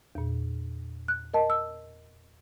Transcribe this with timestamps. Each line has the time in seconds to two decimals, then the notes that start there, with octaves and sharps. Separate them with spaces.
0.15 E2 A#2
1.08 F#6
1.34 A#4 D#5 A5
1.50 E6